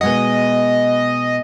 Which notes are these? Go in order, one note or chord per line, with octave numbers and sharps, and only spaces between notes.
B2 G#3 D#5 F#5